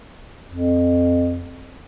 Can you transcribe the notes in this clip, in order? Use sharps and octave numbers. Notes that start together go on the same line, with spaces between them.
F2